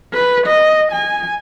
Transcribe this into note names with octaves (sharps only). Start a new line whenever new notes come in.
B4
D#5
G#5